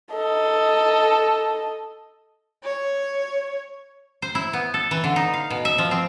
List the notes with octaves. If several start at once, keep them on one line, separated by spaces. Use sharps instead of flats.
A4 D#5
C#5
C5
E4
B3
A4
E3
D3
D#4
F5
B2
E5
F3
C4